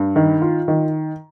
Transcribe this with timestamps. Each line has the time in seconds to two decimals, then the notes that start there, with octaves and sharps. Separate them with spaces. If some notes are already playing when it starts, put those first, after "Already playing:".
Already playing: G2
0.16 D#3
0.42 F4
0.68 D#3